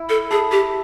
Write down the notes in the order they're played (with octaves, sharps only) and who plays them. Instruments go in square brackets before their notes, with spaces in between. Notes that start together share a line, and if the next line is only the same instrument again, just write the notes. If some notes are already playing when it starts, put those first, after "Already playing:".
Already playing: [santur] E4
[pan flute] A4
[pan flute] G#4 [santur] A4
[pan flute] G4